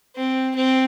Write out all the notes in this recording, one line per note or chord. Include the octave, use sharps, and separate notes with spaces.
C4
C4